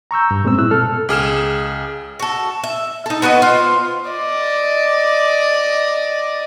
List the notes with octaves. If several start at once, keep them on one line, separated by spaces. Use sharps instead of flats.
A#5 C#6 E6 G6
G2
A#2 G#3 B3 C4 E6
E4 E6 F#6
B2 A4 F6
C#2 G#4 F6 E7
F#4 A4
E5
D#4 A4
B3 F#4 B4 D#5
F4 C5
D5 D#5